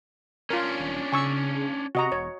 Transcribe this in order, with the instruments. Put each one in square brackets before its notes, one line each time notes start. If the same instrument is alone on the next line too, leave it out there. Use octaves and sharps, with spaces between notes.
[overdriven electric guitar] C#4 D4 [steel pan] F4 A#4
[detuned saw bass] D#1
[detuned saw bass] C#3 [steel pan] G#5 C#6 E6
[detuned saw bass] C3 [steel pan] F#4 D#5 A#5
[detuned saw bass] E1 [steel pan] C#5